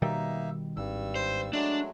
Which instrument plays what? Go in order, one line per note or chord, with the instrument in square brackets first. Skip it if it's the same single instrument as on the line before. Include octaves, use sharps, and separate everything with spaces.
[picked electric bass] B2 D#3 G3 [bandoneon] A#3 D#4 E5
[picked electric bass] G#1 [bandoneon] G2 G3 E6
[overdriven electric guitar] C5
[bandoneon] F#3 G#3 A3 [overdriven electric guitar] D4